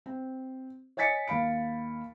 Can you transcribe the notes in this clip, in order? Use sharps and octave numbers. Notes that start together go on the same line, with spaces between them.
C4
C#5 D#5 G#5 A6 B6 C#7
D#2 F5 B5 D7